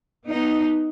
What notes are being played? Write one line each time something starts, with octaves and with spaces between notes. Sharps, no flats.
B3 D#4